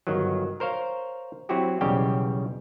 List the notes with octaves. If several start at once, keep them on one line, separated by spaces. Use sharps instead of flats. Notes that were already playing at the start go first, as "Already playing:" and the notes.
G1 D#3 F#3
A#4 C5 C#5 F5
F#3 C4 E4 F#4 G4
B1 E2 C#3 G3 G4 G5